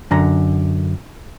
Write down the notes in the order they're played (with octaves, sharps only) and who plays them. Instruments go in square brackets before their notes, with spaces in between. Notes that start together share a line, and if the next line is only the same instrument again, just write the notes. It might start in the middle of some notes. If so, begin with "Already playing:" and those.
[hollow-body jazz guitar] F#2 D3 A#5